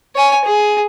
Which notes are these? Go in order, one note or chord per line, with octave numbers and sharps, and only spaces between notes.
C#5 G#5
G#4